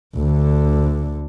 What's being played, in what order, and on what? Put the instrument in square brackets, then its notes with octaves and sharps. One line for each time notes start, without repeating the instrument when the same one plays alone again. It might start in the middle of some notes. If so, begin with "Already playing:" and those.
[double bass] D2 D3